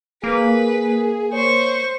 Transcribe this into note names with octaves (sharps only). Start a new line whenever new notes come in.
A#3 G#4 B4
C5 C#5 C#6